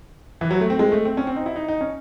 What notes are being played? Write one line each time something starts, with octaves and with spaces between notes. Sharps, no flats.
E3
F#3
A3
C4
G#3
A3
C4
C#4
C4
D#4
E4
D#4
D#4
C#4